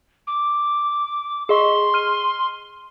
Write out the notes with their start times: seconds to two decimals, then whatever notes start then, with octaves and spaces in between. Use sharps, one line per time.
0.27 D6
1.49 G#4 D#5 C6 C#6
1.94 F6 D#7